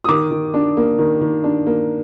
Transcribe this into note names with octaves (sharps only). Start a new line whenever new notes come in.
D#6
D#3 D6
D#3
D4
A#3
D#3
D#3
D4
A#3